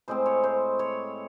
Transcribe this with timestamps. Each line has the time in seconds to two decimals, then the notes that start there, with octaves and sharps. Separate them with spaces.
0.08 A2 G#3 C4 C5
0.26 C#5
0.44 C5
0.79 C#5